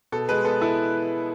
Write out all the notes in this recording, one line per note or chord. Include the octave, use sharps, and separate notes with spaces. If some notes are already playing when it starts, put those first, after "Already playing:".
B2 A4
G#3 B4
B3 A4
E4 A4